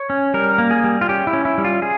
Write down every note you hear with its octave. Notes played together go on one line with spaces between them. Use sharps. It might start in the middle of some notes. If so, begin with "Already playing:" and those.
Already playing: C#5
C#4
G3 A#4
A#3
G#4
G3
F4
C#4 G4
E4
C#4
E4
G3
F4
G#4